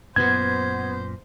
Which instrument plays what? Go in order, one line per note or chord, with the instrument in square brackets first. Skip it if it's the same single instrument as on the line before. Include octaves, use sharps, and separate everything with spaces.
[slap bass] F#2 A#2 [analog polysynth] B3 [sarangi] C5 [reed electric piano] G#6